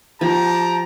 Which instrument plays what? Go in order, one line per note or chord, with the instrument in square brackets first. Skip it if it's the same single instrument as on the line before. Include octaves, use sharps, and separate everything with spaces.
[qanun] F3 [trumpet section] G4 A5 A#5